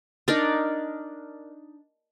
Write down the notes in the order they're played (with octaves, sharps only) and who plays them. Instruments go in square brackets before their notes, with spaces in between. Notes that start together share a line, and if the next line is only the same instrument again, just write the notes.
[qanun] D4 D#4 A#4 D5